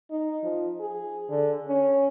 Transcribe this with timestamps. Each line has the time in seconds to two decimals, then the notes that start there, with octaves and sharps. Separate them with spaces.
0.11 D#4
0.43 F3
0.80 G#4
1.30 D3
1.68 C#4